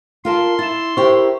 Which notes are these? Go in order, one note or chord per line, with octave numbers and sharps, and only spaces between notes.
F4 A#4 A5 C6
E4 A6 E7
E4 G4 A#4 C5 C#6